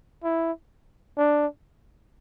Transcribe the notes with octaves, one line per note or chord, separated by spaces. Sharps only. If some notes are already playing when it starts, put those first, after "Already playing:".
E4
D4